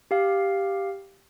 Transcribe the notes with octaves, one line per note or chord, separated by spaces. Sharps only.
G4 F5